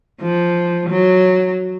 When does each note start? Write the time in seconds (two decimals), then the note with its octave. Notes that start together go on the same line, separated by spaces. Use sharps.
0.21 F3
0.89 F#3